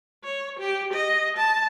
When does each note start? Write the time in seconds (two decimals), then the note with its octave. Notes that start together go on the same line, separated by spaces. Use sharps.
0.24 C#5
0.59 G4
0.93 D#5
1.37 A5